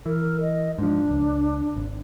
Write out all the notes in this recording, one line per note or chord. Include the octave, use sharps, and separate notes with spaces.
E3 A#4
D#5
G#2 F3 D4
C#2
G#1